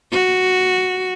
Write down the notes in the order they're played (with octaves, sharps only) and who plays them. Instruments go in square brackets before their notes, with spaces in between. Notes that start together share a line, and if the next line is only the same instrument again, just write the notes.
[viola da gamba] F#4